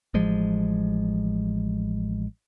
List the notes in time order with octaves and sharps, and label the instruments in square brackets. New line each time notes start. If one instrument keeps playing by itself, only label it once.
[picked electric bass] A1 F3 G#3